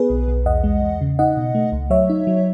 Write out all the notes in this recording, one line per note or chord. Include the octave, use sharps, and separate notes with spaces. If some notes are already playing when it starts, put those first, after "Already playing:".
Already playing: B3 G#4 B4
B1
B1
E2 D#5 F#5
G#3
E2
C#3
D#4 D#5 F#5
B2
A3
C#2
F#3 C#5 E5
D#4
F#3